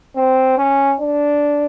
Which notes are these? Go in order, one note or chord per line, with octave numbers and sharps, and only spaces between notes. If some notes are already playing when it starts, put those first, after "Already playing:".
C4
C#4
D4